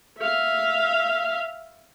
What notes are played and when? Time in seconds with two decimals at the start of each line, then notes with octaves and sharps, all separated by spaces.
0.19 E5 F5